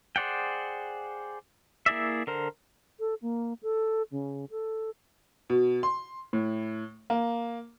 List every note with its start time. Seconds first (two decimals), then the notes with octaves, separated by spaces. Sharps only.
0.16 G#4 C5 D5 F#5 G5
1.86 A#3 E4 G#4 D5 E5
2.27 D3 A#4 C5
3.00 A4
3.22 A#3
3.63 A4
4.12 C#3
4.51 A4
5.50 B2
5.83 C6
6.33 A2
7.10 A#3